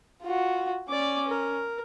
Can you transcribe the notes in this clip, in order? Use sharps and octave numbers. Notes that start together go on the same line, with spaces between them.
F4 F#4
C#4 D5 D6
A#4